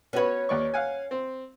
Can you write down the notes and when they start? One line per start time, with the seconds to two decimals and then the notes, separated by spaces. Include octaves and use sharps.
0.13 B3 C#4 F#4 B4 C#5
0.49 D#2 D5 C#6
0.74 F5 F#5 G#5
1.11 C4